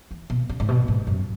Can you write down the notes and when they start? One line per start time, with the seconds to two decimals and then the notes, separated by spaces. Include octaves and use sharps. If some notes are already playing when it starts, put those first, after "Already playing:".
0.11 E3
0.30 B2
0.49 C#3
0.60 G#2
0.69 B2
0.88 G#2
1.07 F#2